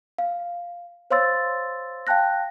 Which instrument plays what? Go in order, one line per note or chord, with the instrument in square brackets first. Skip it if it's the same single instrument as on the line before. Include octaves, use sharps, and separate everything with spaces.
[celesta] F5
C5 C#5 F5 C6 E6 A6
F5 G5 A5 F#6 A#6